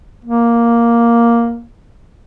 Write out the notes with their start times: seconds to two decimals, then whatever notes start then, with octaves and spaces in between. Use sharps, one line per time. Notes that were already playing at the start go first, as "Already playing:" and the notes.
0.25 A#3